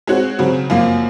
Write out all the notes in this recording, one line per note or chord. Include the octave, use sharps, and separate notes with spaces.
G#3 C4 F#4 C#5
C#3 F#3 C4
F#2 F3 A#3